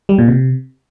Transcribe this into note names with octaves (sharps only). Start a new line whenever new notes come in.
G3
A#2
C3